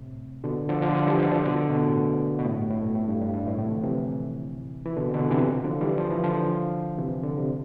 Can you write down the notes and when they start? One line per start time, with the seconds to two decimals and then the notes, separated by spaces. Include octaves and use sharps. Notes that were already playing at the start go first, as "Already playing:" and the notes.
Already playing: A2 C3
0.44 B2 D3
0.69 D3 F3
0.81 D3 F3
0.95 D3 F3
1.07 E3 G3
1.20 D3 F3
1.32 D3 F3
1.45 B2 D3
1.70 B2
1.82 A2
2.38 B2
2.45 A2
2.58 G2
2.71 A2
2.83 B2
2.95 A2
3.08 G2
3.21 G2
3.34 G2
3.46 A2
3.58 A2 C3
3.66 E3
3.71 D3 F3
3.84 C3 E3
4.85 E3
4.97 B2 D3
5.14 B2 D3
5.30 C3 E3
5.64 D3 F3
5.81 E3 G3
5.98 F3
6.11 E3
6.24 D3 F3
6.98 C3 E3
7.23 D3
7.38 C3